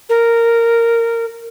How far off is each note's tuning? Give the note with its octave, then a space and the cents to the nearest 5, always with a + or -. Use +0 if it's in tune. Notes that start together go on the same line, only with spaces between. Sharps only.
A#4 -10